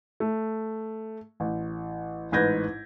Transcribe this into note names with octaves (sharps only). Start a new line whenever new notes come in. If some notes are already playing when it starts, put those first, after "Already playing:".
A3
A1
A1 G#2 B4 G6 G#6 A#6